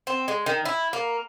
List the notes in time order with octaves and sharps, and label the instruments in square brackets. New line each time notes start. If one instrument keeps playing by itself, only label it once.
[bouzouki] C4
G#3
D#3
E4
A#3